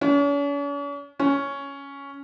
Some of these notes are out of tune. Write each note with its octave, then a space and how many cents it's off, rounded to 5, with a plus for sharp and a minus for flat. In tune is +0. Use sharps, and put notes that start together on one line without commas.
C#4 +45
C#4 +5